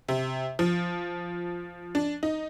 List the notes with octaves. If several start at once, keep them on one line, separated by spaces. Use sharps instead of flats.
C3
F3
D4
D#4